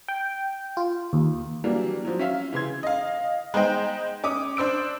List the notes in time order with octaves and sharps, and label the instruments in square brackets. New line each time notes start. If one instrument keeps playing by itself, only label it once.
[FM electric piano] G5
F4
D#2
[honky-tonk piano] E3 F#3 G3 A#3 D4
F3 F#3
C#4 E5 F5
C#3 E3 C6 G#6
D#5 F5
G#3 B3 D#4 C5 D#5 G5
C#4 D6 D#6
D4 C5 E6 D7